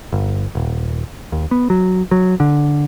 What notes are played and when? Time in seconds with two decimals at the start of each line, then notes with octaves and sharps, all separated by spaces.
0.12 G1
0.55 D#1
1.32 D#2
1.51 B3
1.70 F#3
2.11 F#3
2.40 D3